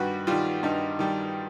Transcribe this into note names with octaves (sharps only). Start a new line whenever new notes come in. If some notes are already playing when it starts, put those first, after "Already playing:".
Already playing: G2 D#3 G3 F#4 B4
D#3 G3 F4
G2 D#4
D#3 G3